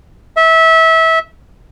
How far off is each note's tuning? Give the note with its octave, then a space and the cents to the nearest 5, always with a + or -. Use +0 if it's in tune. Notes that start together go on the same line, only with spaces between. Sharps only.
E5 -25